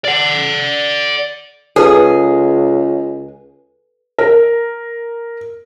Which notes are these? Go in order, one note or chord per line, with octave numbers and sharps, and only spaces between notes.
D5 F#5
C#2 G#4 A4 B4 A5
A#4